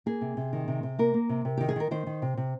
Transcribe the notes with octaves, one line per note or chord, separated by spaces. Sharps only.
A#3 G#4
C3
C3
D#3
C3
C3
A#3 A#4
A#3
C3
C3
D#3 G4
G#4
D#3 A#4
D#3 C5
D#3
C3
C3